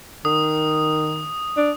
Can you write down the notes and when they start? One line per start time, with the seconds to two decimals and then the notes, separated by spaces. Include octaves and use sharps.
0.25 D#3 D#6
1.57 D4